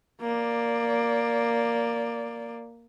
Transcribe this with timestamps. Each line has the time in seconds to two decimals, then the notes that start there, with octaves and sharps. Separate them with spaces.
0.21 A#3 D5